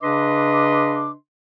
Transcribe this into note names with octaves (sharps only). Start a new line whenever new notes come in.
C#3 D4 B4 D#5 C6 D6